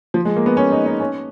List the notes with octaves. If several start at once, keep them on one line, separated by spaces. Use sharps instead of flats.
F3
G#3
A#3
B3
C#4
D#4
D#4
C#4